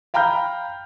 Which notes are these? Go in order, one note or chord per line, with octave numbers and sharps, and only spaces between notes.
F5 G5 A#5 B5 F6 G6